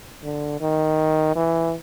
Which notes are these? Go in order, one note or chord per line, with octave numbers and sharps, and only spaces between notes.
D3
D#3
E3